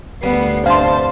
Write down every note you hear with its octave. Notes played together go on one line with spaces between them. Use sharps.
D2 G3 B3 C7
G2 C3 C5 F5 A5 C6